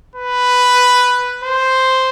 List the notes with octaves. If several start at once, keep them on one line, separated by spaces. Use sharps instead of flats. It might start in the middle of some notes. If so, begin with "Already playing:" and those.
B4
C5